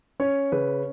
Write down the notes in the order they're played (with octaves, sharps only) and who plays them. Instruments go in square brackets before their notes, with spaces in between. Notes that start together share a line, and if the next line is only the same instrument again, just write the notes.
[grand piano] C#4 C#5
C#3 B4